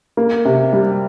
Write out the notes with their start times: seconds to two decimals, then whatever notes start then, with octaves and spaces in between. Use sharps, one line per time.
0.17 A#3
0.45 C3
0.73 G3